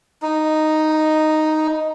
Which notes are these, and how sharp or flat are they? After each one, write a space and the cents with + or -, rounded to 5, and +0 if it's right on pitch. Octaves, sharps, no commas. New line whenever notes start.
D#4 -5